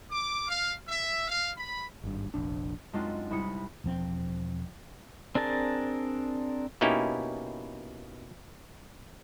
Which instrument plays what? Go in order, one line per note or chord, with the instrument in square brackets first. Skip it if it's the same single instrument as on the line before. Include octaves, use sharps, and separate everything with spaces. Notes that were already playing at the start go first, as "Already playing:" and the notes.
[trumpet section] D6
F5
E5
F5
B5
[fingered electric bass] G#1 G2
F1 A#1 D4
[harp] F#2 G#3 C4 D4 D#4 F4
C2 E4 B5 D#6 C#7
[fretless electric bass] E1 F3 C4
[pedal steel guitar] C4 D4 G#4 A#4 A5
[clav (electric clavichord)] B2 A#3 C#4 D#4 E4 G4